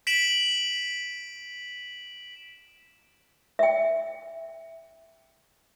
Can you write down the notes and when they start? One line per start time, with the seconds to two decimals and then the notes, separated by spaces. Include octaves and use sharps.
0.07 B6 D7 E7 F#7
3.59 E5 G5